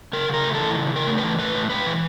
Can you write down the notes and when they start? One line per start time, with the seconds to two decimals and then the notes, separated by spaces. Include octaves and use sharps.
0.13 C#3 A#4
0.28 C#3
0.34 A#4
0.44 A3
0.55 A4
0.60 E3
0.75 C#3
0.91 C#3 A#4
1.07 A3
1.18 B4
1.23 E3
1.39 A2 B4
1.54 A2
1.70 G#3 B4
1.87 E3